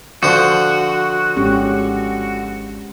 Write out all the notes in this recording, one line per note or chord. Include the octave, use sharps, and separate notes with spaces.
D3 F3 F#4 C5
G#1 G#3 C#4 G4